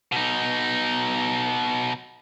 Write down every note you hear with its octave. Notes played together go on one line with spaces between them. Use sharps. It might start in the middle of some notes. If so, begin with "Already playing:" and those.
B2 D#4